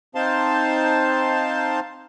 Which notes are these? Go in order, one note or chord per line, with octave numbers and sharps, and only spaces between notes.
C4 D#4 C5 F5 A5 C6